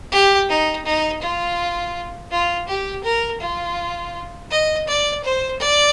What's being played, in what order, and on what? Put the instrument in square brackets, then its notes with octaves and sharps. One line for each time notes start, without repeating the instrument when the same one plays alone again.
[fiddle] G4
D#4
D#4
F4
F4
G4
A#4
F4
D#5
D5
C5
D5